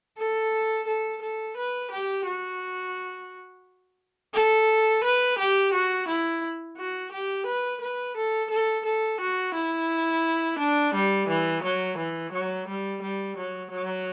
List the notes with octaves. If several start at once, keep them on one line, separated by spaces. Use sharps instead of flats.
A4
A4
A4
B4
G4
F#4
A4
B4
G4
F#4
E4
F#4
G4
B4
B4
A4
A4
A4
F#4
E4
D4
G3
E3
F#3
E3
F#3
G3
G3
F#3
F#3